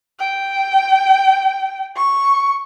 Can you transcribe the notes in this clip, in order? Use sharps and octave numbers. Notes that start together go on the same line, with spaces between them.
G5
C#6